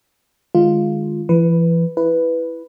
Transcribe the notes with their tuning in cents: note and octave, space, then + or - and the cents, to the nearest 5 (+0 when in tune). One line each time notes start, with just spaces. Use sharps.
D#3 -40 G#3 +0 F4 +0
E3 +35 B4 +0
E4 +0 B4 +0